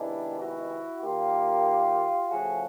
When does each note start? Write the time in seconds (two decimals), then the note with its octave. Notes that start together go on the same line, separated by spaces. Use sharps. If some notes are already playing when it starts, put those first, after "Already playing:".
Already playing: C3 D#3 G#3 B3 D4 E4
0.41 E4 F#4
1.03 D#3 G3 A#3 F4 G4
2.30 C#3 F3 A3 F#4 G#4